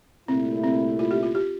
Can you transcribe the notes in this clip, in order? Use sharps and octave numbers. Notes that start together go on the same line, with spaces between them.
C2 A#2 A3 C4 E4
C4
F4
G4
F4
G4